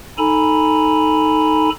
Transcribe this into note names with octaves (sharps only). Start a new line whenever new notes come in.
D#4 A4 G#5 A#5 B5